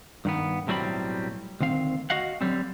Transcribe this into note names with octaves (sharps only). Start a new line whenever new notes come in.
G2 D#3 B3
B1 A2 F#3 G3 C4 B5
D2 D#3 C4 F5
F#4 D#5 F5 F#5
D3 F#3 G3 C4